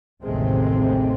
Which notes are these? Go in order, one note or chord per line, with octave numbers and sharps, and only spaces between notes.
A1 D#2 C3 G#3 A3 C4